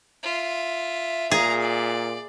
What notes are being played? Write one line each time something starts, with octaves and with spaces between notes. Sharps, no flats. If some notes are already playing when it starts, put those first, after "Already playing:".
F4 E5
A#2 G#4 F5 A#5
D5